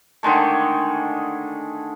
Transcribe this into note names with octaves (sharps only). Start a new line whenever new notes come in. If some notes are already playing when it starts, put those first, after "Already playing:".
D3 D#3 G#3 A3